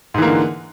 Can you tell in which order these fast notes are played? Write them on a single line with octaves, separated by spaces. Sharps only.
G#2 E3 A#3 D3